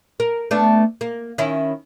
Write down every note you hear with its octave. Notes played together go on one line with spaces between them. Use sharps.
A#4
A3 B3 D4
A#3
D#3 C#4 E4